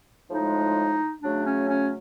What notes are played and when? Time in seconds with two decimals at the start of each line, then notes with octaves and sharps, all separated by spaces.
0.30 A2 F3 G#3 D#4
1.22 C#3 F#3 A3 D4
1.46 C#4
1.68 C#4